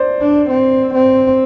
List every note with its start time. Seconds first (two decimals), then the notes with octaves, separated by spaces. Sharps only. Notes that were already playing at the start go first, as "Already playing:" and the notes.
Already playing: C5 D5
0.21 D4
0.50 C4
0.95 C4